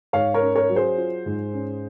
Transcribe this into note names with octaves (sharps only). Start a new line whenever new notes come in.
G#2 C#5 F5
A#4 C#5
C#4
A#4 C#5
F#3
G#4 C5
F4
G#2
C#4